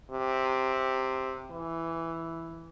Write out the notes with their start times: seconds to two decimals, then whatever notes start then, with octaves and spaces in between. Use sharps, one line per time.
0.11 C3
1.51 E3